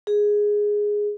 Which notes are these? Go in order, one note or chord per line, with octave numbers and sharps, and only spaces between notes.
G#4